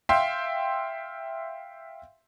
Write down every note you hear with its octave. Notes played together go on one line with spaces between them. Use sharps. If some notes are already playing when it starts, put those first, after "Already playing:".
E5 F5 G5 C6